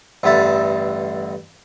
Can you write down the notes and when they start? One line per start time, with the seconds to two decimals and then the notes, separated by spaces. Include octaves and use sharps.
0.23 A1 G2 D3 E5 A5